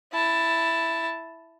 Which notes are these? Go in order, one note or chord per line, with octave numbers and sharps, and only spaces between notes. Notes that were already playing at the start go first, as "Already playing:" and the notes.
E4 A5